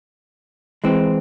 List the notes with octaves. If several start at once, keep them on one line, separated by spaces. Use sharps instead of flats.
E3 G#3 C4